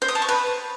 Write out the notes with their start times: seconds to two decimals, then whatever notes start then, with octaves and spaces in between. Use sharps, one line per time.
0.02 C5
0.08 D#6
0.15 A5
0.22 C#6
0.29 B4